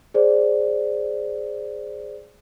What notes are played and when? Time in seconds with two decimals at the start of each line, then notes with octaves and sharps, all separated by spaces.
0.14 G#4 C5 D5